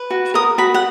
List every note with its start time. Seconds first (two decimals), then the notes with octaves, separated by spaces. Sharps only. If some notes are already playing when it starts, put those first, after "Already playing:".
Already playing: B4
0.10 F#4
0.34 A#4 D#6
0.58 F#4 B5
0.74 F#5